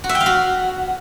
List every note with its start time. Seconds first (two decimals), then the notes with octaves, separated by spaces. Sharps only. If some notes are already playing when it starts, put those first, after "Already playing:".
0.04 F#4
0.09 E5
0.15 G5
0.20 F5
0.26 F#4